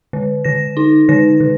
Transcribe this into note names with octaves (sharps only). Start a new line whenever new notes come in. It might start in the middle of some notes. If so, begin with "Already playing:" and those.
D3
D3 A#6
D#4
D3 A#6
D3